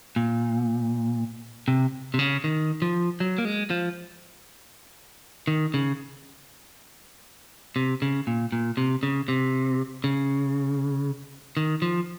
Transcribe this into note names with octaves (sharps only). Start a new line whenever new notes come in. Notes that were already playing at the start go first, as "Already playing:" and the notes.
A#2
C3
C3
C#3
D#3
F3
F#3
A#3
G#3
F3
D#3
C#3
C3
C#3
A#2
A#2
C3
C#3
C3
C#3
D#3
F3